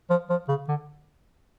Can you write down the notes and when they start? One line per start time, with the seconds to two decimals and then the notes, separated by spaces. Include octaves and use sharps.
0.10 F3
0.30 F3
0.48 C#3
0.69 D3